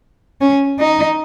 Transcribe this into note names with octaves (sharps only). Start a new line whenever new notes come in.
C#4
D#4